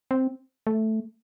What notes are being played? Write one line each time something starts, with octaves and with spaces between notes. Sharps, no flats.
C4
A3